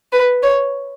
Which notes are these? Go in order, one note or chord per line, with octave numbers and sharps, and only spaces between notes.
B4
C#5